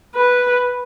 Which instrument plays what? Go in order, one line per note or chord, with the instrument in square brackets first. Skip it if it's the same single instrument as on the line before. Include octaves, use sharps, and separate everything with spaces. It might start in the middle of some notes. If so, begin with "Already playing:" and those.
[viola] B4